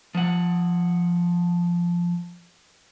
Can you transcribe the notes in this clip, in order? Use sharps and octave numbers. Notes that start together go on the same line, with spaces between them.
F3 F#5